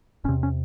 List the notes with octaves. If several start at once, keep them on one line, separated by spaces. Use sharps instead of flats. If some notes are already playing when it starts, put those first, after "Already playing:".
F1 E2 C3 C#4
C#4